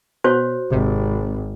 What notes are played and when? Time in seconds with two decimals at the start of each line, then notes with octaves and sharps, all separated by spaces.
0.24 B2 F#4 C5 C#5
0.71 G#1 C3